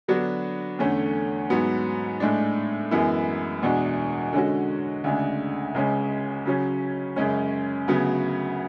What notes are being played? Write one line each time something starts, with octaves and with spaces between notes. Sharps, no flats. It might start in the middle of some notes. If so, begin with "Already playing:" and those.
D3 F#3 B3 D4 F#4
E2 D3 A3 C#4
G#2 F#3 B3
A2 G#3 D4
F#2 E3 G#3 B3 E4
E2 B2 G#3 D4
D3 G#3 C#4 F#4
D2 C#3 G#3 D4
C#2 C#3 G#3 C#4
C#3 F#3 C#4
F#2 C#3 G#3 C#4
D2 C#3 F#3 B3